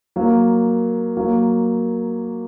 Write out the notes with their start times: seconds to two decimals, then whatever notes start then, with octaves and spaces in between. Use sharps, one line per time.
0.16 F#3 A#3
1.17 F#3 A#3